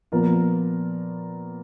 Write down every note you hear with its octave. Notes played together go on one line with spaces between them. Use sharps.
A#2 F3 B3 F4 A#4